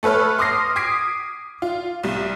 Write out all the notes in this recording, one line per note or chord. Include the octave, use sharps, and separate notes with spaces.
A3 A4 B4 C#5 F6
C6 D6 D#6 F6 A#6 C7
D6 D#6 G#6 B6 C7 D7
F4
C2 G3